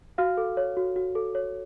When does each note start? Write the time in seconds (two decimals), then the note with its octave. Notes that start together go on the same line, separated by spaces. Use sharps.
0.18 F#4 F5 F6
0.37 A4
0.57 C#5
0.77 F#4
0.96 F#4
1.15 A4
1.35 C#5